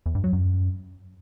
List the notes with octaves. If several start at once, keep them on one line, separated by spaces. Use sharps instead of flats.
E2
G2
F#3
F#2